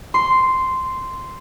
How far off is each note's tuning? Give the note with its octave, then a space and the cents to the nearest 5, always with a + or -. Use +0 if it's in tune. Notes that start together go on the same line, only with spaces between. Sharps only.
C6 -5